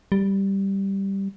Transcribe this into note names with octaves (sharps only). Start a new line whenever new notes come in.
G3